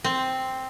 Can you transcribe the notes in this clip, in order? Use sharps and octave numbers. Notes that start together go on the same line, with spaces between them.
C4